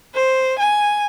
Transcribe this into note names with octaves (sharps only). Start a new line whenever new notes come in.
C5
G#5